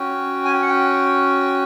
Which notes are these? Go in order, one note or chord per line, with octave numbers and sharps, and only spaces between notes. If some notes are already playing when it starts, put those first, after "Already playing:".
Already playing: C#4 F#4 G5
G#5
G5
F#5
G5